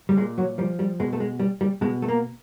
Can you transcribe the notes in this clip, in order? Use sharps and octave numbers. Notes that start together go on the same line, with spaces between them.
G3
A#2 G#3
F#3
F3 G3
G3
B2 G#3
A3
G#3
G3
G3
B2 G#3
A3
A#3